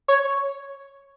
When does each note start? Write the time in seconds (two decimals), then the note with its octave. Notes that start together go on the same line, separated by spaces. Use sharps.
0.08 C#5